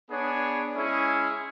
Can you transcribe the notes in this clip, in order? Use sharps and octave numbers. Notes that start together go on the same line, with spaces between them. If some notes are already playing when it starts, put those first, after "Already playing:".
B3 D4 G#4 C#5
G#3 C#4 E4 G#4